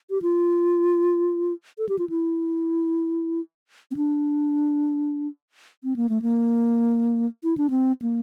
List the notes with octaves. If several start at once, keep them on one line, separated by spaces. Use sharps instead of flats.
G4
F4
A4
G4
F4
E4
C4
D4
C4
A#3
A3
A#3
E4
D4
C4
A#3